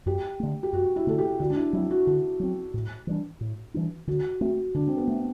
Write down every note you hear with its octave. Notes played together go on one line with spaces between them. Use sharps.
F#2 G4
D3 A3
G4
F#2 F#4
E4
D3 A3 A4
G4
D3 F#4
D4
E4
F#3 C4 E4
F#4
D3 F#4
F#3 C4
A2
E3 G3 D4
A2
E3 G3 D4
D3 F#4
A3 C4 F#4
D3 D4
C4
B3
A3 C4